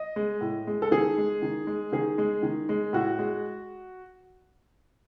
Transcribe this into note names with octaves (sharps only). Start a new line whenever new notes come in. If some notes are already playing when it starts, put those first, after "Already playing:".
Already playing: D#5
G#3
A2
G#3
A4
D#3 G#4
G#3
D#3
G#3
D#3 G#4
G#3
D#3
G#3
A2 F#4
G#3